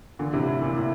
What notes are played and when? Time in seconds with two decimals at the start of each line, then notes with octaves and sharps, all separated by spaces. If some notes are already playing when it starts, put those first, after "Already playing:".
0.19 A#2 D3
0.33 A2 C3
0.47 A2
0.62 A#2
0.76 A2